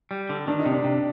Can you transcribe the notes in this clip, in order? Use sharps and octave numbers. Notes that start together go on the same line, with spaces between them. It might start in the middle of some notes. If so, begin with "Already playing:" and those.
G3
D3
D#3 D4
D#4
C3
D4
C3